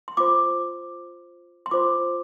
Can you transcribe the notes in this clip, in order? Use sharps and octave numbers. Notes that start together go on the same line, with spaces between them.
C6
F4 C5 D6
C6
F4 C5 D6